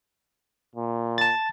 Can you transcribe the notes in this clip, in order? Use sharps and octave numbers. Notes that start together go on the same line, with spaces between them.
A#2
A5 A6